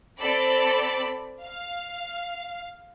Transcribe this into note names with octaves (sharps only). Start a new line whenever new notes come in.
C4 A4 D5 B5
F5